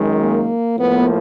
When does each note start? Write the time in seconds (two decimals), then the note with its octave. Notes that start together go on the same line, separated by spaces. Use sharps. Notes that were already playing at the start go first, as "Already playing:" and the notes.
Already playing: F#2 D#3 G#3
0.17 A#3
0.78 A2 F3 A#3 B3